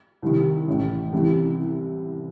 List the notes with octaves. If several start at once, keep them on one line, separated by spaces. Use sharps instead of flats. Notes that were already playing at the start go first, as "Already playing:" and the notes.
C2 C3 D#3
A1 A2 E3
C2 C3 E3